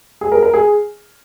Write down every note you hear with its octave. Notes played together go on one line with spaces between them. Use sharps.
G#4
A#4
A#4
G#4